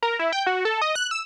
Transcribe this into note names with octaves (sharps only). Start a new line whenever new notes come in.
A#4
E4
G5
F#4
A4
D#5
F#6
E6